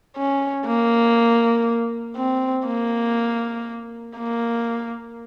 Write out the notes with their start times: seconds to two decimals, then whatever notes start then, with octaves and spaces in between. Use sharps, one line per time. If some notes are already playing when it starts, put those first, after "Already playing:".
0.17 C#4
0.66 A#3
2.17 C4
2.67 A#3
4.16 A#3